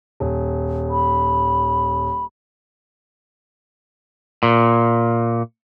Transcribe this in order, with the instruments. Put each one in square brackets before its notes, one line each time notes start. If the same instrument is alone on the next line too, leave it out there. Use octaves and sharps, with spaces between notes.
[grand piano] D#1
[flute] B5
[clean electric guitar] A#2